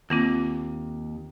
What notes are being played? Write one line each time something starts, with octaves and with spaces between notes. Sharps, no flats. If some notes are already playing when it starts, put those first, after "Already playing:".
D#2 A#3 C4 F4